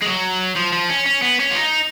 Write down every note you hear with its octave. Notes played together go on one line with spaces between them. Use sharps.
G#3
F#3
F3
F3
C#4
C#4
B3
C#4
F4
D#4